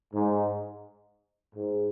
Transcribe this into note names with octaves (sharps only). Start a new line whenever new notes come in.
G#2
G#2